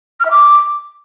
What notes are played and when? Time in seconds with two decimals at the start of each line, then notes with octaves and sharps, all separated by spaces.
0.20 F6
0.25 E5
0.30 D6